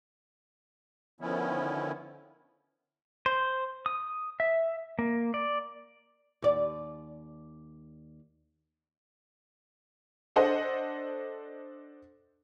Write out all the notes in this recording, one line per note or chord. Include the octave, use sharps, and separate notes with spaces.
D3 D#3 F3 B3 C#4 E4
C5
D#6
E5
A#3
D5
D#2 D5
D4 A4 C5 D#5 F#5